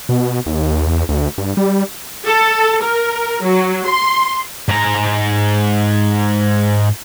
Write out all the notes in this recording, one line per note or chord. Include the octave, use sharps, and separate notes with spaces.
B2
D#2
E2
D2
G2
G3
A4
A#4
F#3
C6
G#2 A#5